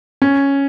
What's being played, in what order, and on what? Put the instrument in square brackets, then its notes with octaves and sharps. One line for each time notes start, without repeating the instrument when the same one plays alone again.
[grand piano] C#4